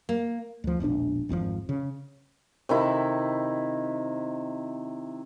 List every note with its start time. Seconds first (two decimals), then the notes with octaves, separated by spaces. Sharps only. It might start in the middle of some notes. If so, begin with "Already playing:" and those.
0.09 A#3
0.64 D2 F3
0.80 E1 A#1 C4 D4
1.29 G#1 F2 B2 F3
1.69 C#3
2.69 C3 D#3 E4